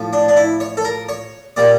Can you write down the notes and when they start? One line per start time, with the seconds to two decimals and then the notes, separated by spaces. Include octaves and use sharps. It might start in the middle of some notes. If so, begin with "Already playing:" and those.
Already playing: A2 F3
0.13 D4
0.28 D4
0.36 E4
0.60 C#5
0.77 A4
0.85 A#4
1.09 C#5
1.56 A#2 G3 D5